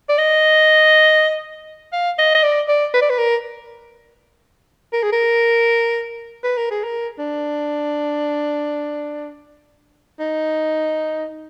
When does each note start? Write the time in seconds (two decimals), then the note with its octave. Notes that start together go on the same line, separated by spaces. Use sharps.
0.09 D5
0.18 D#5
1.92 F5
2.18 D#5
2.34 D#5
2.43 D5
2.68 D5
2.93 B4
3.01 D5
3.10 B4
3.18 A#4
4.93 A#4
5.03 G#4
5.12 A#4
6.44 B4
6.57 A#4
6.71 G#4
6.83 A#4
7.18 D4
10.19 D#4